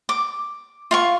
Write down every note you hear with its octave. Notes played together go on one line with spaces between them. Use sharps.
D6
F4 F5 C#6